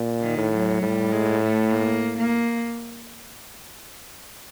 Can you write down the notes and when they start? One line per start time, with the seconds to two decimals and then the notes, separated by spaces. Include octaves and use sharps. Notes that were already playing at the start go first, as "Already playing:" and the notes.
Already playing: A#2
0.22 D#3
0.37 A2
0.53 F#3
0.82 A2 G3
1.12 G#3
1.43 A3
1.73 A#3
2.18 A#3